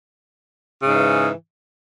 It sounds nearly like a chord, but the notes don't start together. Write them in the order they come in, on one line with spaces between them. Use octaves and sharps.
C#3 G#2 E3